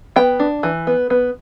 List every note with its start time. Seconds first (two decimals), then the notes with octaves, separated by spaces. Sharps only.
0.16 B3 G5
0.40 D4
0.63 E3
0.87 B3
1.10 B3